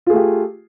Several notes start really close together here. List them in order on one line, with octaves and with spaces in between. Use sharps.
F4 G#4 A3 G4